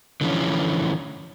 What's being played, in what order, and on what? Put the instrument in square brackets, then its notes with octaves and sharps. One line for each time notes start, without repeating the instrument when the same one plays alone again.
[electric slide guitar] D3 E3 F3 C#4